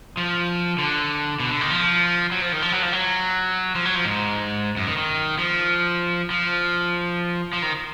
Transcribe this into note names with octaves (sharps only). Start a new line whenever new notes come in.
F3
D3
B2
D3
D#3
F3
F#3
F3
D#3
F3
F#3
F3
F#3
F3
F#3
F3
G#2
F#2
D#3
D#3
F3
F3
F3
D#3